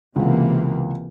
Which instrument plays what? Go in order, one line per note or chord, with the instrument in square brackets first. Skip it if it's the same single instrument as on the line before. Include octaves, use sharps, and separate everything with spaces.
[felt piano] C#2 F#5 [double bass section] C3 E3 A#3